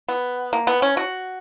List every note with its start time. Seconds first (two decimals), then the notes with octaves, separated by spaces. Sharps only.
0.08 B3
0.53 A#3
0.67 B3
0.82 C#4
0.97 F#4